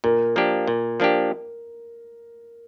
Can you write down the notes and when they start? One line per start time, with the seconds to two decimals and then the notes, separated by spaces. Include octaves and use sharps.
0.04 A#2 A#4
0.36 F3 A#3 D4 G4
0.68 A#2
1.00 F3 A#3 D4 G4